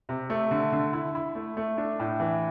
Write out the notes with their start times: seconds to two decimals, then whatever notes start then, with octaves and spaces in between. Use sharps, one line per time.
0.09 C3
0.30 A3
0.51 D3
0.72 D3
0.93 E4
1.15 E4
1.35 A3
1.57 A3
1.78 D4
1.99 A2
2.20 E3